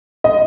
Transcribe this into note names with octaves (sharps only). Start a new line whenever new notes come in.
D#5